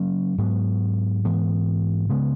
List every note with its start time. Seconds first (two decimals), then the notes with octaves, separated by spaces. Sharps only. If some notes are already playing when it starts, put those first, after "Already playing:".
Already playing: C#3 F#3 A#3 C#4
0.38 G#2 F#3 B3
1.25 G#2 E3 B3
2.09 C#3 G#3 B3